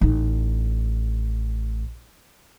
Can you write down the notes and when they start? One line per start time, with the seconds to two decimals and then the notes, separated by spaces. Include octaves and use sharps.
0.01 A1 D#4